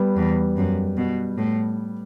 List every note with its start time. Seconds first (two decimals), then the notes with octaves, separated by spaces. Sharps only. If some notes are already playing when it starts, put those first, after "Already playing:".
Already playing: G3 B3
0.16 E2
0.57 F#2
0.97 B2
1.38 A2